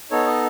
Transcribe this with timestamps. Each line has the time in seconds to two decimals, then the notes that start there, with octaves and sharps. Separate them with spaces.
0.11 B3 D#4 A4 C#5
0.26 D#5